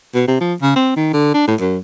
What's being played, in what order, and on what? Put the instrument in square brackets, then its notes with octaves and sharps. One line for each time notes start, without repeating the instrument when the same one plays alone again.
[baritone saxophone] B2
C3
F3
C#3
C4
D#3
D3
D4
A2
F#2